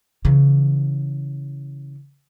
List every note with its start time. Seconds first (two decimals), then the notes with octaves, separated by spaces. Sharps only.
0.25 C#3 E3